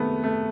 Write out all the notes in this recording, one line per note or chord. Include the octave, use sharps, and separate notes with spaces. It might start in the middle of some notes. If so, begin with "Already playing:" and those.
Already playing: C3 D#3 G#3 A3 B3
A3